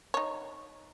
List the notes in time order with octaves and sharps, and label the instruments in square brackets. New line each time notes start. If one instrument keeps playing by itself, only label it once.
[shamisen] D#4 C#5